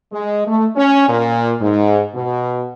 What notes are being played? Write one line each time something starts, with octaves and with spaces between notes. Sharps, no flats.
G#3
A3
C#4
A#2
G#2
B2